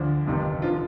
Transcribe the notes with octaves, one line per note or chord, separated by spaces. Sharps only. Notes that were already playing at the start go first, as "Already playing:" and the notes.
Already playing: D2 D3 F3 D4
G1 F2 C3 D#3
D3 F3 F4